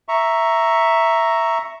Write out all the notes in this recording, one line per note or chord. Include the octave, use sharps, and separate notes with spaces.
E5 A#5 C#6